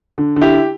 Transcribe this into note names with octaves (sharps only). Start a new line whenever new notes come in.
D3
D3
E4 G4